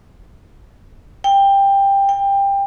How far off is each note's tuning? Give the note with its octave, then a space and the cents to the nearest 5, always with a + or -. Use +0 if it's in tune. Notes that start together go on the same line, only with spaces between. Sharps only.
G5 +15
G5 +20